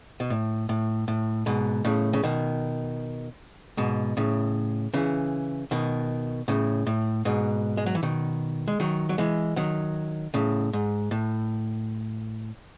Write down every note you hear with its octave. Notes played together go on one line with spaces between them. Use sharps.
B2
A2
A2
A2
G#2 B2
A2 C#3
C#3
B2 D#3
G#2 B2
A2 C#3
C#3 E3
B2 D#3
A2 C#3
A2
G#2 B2
G#3
F#3
E3
B2 D#3
G#3
D#3 F#3
F#3
E3 G#3
D#3 F#3
A2 C#3
G#2
A2